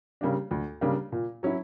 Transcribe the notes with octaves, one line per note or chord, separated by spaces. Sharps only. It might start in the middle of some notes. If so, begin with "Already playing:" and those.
C#3 G3 A#3 D4
D2
C#3 G3 A#3 D4
A#2
F#3 C#4 E4